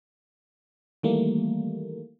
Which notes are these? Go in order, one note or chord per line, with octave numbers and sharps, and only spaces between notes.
D#3 E3 G3 A3 A#3